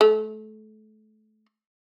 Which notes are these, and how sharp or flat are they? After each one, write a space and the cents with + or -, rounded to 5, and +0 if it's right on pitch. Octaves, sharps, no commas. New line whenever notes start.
A3 -30